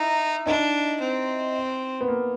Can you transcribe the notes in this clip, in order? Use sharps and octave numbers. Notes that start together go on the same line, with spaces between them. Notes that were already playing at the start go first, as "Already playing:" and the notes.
Already playing: D#4 E4
D4 D#4
C4
B3
A#3